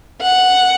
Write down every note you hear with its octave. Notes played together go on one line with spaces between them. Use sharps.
F#5